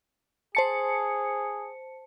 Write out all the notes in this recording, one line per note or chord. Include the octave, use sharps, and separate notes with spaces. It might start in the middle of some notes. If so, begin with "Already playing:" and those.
G#4 C5 A5 C#7